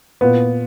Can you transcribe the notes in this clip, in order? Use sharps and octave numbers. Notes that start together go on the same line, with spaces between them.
A#2 B3